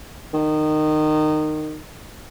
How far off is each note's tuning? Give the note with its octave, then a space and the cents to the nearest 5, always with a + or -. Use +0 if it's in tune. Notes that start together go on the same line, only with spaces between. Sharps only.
D#3 -20